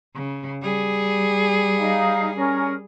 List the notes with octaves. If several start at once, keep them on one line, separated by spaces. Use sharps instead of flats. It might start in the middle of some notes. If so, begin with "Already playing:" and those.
C#3
G3 G#4
D#4 F5
C#4 A#4